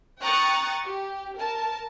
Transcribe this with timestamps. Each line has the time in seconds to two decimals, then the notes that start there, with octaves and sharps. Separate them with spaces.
0.20 G5 A#5 C#6 D#6 F#6 A6
0.82 G4
1.38 A#4 A5